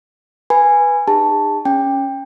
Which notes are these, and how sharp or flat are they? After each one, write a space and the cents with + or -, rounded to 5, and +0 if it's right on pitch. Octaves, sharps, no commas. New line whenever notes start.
B4 +0 G#5 -10 B5 +0
D#4 -30 G#4 -40 A5 +0
C#4 +0 G5 +20